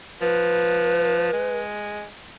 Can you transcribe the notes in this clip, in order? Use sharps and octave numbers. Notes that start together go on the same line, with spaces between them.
F3 B4
G#3